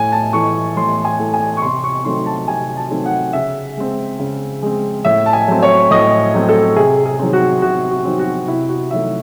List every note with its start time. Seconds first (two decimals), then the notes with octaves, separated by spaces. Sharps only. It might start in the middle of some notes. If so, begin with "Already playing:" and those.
Already playing: A2 G#5
0.12 A5
0.33 E3 A3 C#6
0.77 A2 C6
1.05 G#5
1.19 E3 A3
1.34 G#5
1.57 C#6
1.62 C3 C6
1.84 C#6
2.05 D#3 F#3 A3 C4 C6
2.26 A5
2.48 C3 G#5
2.77 A5
2.91 D#3 F#3 A3 C4
3.06 F#5
3.33 C#3 E5
3.77 G#3 C4
4.19 C#3
4.62 G#3 C4
5.05 A2 E5
5.26 A5
5.33 G#5
5.48 F#3 A3 C4
5.63 C#5
5.91 A2 D#5
6.34 F#3 A3 C4
6.49 A4
6.76 C3 G#4
7.06 G#4
7.19 D#3 F#3 C4
7.33 F#4
7.62 C3 F#4
7.91 F#4
8.05 D#3 F#3 C4
8.19 F#4
8.48 C3 E4
8.69 F#4
8.91 D#3 F#3 A3 E5